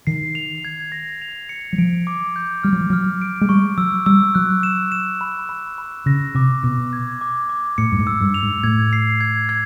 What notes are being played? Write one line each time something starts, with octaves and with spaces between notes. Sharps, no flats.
D#3 C7
F7
G#6
A#6
F7
C#7
F#3
F3 D7
D6
G6
G3 F6
F#3
F3
F#3 F6
D7
G#3
G3 C#6
F#3 E6
G3 E6
F#3 F#6
E7
E7
B5
B5
B5
C#3 A#6
C3 D6
B2 A#6
G#6
D6
D6
A2 C#7
G2
G#2
E6
G2
F7
G#2
A2 G#6
C7
G#6
G#6